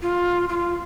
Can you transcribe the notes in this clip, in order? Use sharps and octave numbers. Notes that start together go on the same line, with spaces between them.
F4
F4